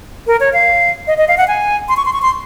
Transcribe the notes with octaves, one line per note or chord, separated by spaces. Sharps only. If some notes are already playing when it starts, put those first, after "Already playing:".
A#4
C#5
F5
D#5
D#5
F5
F#5
G#5
C6
C#6
C6
C#6
C6